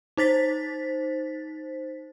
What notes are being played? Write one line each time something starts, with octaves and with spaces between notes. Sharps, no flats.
D#4 C5 A6 B6